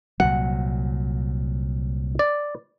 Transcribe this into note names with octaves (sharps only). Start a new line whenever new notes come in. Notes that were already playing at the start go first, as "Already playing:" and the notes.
C2 A#2 F#3 F#5
D5